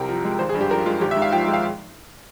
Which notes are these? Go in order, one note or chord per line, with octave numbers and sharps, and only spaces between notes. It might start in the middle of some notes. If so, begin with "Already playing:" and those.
Already playing: C2 C3 A#4 G5
F3
G#3
G#1 C5
G#4
G2
G4
F3 A#4
G#3 F4
G#1 G4
G#2 E5
F5
F3 G5
G#3
F5